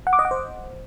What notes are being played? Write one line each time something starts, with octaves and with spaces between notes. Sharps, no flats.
F#5
D6
D#5
F#5
C5